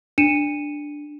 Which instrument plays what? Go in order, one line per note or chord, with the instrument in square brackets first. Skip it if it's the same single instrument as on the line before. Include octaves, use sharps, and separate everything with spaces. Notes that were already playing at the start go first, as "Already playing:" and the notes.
[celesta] D4 C#7 D#7 E7